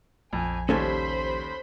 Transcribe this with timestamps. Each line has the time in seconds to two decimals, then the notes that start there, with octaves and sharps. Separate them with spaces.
0.33 A#1 F2 F3 G#5
0.69 D#2 G3 C#4 A4 C5 G#5 B5